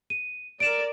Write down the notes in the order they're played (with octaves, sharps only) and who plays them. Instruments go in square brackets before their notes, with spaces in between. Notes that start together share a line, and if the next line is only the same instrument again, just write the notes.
[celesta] D#7
[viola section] A#4 D5 [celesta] D7 E7